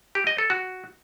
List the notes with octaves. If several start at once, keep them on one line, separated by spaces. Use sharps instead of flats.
G4
D#5
A4
F#4